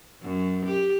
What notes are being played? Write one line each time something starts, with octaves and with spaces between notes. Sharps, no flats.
F#2
G4